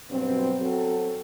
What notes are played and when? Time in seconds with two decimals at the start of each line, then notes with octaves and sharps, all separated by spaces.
0.10 G2 B2 F#3 C4
0.61 F#3 C4 F#4 A4